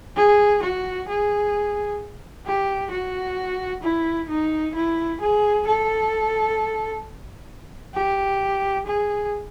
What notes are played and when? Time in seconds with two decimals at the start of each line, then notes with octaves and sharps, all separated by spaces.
0.16 G#4
0.62 F#4
1.08 G#4
2.46 G4
2.91 F#4
3.83 E4
4.29 D#4
4.75 E4
5.21 G#4
5.67 A4
7.95 G4
8.86 G#4